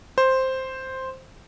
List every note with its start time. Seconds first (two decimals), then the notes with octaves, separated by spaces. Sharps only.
0.18 C5